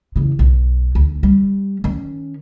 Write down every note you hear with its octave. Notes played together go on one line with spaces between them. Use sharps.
E2 C#3
B1
D2
G3
D#3 C#4